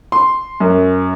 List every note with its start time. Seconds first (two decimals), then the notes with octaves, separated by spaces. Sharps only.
0.12 C6
0.60 F#2